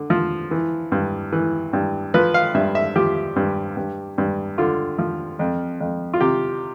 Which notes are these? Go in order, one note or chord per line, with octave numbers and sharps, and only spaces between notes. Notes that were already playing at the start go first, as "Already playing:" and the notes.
Already playing: D3
F3
E3
G2
E3
G2
F3 B4
F5
G2 E5
E5
F3 G4
G2
G2
G2
D3 F4
F3
F2
F2
F4
C3 G4